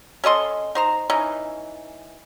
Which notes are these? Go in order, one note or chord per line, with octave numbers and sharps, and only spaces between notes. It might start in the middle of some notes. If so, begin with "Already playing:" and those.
C#4 A4 D#5 C6
D#4 C5 A#5
E3 C#4 D#4